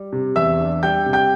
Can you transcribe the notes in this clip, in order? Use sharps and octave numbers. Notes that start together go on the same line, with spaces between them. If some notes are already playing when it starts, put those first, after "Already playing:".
Already playing: G3
C3
E2 E5 E6
D4
G3 G5 G6
C3
G5 G6